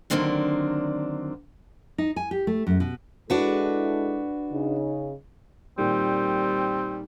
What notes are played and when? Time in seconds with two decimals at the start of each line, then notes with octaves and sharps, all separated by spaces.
0.10 D3 D#3 F#3 A#3 C4 D4
1.98 D#4
2.16 G#5
2.31 G4
2.47 A3
2.67 F#2
2.80 B2
3.30 G#3 D4 E4 F#4 A4 B4
4.52 C#3 D#4
5.78 A#2 D#3 G3 C4